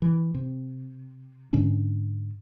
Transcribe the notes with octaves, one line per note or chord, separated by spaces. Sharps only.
E3
C3
G#2 D3 C#4 D4